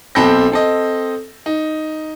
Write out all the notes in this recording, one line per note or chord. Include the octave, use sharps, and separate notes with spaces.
B1 C4 A4 B5 G6 A#6
C4 A4 D#5
D#4